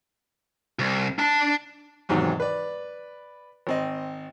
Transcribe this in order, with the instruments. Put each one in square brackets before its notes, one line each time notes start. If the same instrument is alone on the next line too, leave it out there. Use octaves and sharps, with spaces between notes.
[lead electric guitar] C2
D4 A5
[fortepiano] E2 G#2 C3 D#3 F#3
B4 D5
G#1 C4 D#5